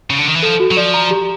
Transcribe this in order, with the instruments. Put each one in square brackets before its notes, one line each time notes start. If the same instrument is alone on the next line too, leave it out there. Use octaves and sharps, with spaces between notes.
[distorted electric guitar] C#3
D3
D#3
E3
[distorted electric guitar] F3 [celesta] A4
[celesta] F#4
[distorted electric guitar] F#3
[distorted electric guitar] F3 [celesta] D5
[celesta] A#5
G4